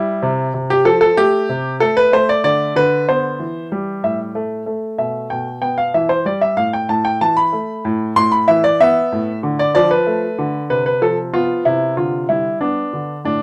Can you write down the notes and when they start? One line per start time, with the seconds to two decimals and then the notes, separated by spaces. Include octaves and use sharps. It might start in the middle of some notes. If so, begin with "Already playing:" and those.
Already playing: G3 E4
0.23 C3
0.54 C3
0.70 G4
0.85 F3 A4
1.01 A4
1.17 A3 G4
1.49 C3
1.80 A3 A4
1.97 B4
2.12 A3 C5
2.29 D5
2.44 D3 D5
2.76 D3 B4
3.08 B3 C5
3.39 E3
3.72 G3
4.03 A2 E5
4.35 A3
4.66 A3
4.98 B2 E5
5.30 B2 G5
5.62 B3 G5
5.78 F5
5.94 E3 E5
6.09 C5
6.25 G3 D5
6.41 E5
6.57 A2 F5
6.73 G5
6.89 A2 A5
7.05 G5
7.21 E3 A5
7.37 B5
7.53 A3
7.85 A2
8.16 A2 C6
8.32 B5
8.48 E3 E5
8.64 D5
8.80 B3 E5
9.12 A2
9.43 D3
9.59 D5
9.75 F3 D5
9.91 B4
10.07 A3
10.39 D3
10.70 C3 B4
10.86 B4
11.02 F3 A4
11.34 B3 F4
11.65 C3 E4
11.97 D3 F4
12.29 G3 E4
12.61 B3 D4
12.93 D3
13.24 A2 D4